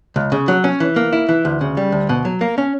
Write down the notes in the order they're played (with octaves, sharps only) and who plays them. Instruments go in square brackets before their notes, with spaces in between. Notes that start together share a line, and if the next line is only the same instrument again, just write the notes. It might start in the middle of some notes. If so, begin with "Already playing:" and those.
[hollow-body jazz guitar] C#2
C#3
F#3
C#4
E3
A#3
E4
E3
D2
C#3
G3
D2
B2
F#3
A#3
C#4